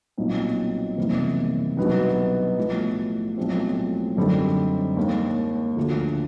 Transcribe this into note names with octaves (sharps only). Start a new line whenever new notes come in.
B1 A#2 G3 C4 D#4
F#1 E2 C3 D#3 G3
C2 B2 F#3 B3 D#4
B1 A2 F3
B1 A2 F3 G#3 C4
F#2 D3 G3 C4 D#4
D#2 D#3 G#3
D2 D3 F3